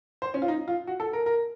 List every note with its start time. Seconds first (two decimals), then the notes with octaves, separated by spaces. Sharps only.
0.22 C5
0.34 C#4
0.42 F4
0.48 D#4
0.68 F4
0.87 F#4
1.00 A4
1.13 A#4
1.26 A#4